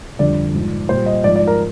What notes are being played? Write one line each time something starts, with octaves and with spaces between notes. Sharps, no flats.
F2 D3 G3 D5
G#2 F3
A#2 G3 C5
D#5
G#2 F3 D5
D5
A#4